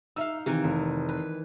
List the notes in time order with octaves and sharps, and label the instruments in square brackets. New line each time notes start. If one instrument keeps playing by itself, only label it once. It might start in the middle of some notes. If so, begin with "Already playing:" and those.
[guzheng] D#4 F5 [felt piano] E5 E6
[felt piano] C3 [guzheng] D#3 E3 D#4
[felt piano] F1
[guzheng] B4